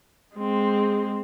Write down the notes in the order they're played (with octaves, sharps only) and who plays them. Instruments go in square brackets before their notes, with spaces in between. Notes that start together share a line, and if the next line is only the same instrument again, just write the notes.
[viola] G#3 C4